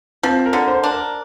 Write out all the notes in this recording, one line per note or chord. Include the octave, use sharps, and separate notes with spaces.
F3 C4
A#4
D3
C5
D4
A#4